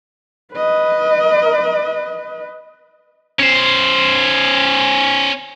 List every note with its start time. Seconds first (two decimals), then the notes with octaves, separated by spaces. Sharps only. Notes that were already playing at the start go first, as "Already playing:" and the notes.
0.53 B4 D#5
3.40 C#4 C5